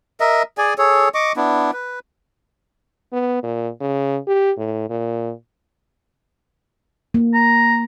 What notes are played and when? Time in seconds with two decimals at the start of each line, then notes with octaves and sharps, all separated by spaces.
0.20 A#4 D#5 E5
0.58 G#4 D5 G#5
0.78 G#4 A4 C#5
1.14 D#5 C#6 D6
1.36 B3 D4 E4
1.73 B4
3.13 B3
3.43 A#2
3.81 C#3
4.27 G4
4.58 A2
4.90 A#2
7.14 A#3
7.34 A#5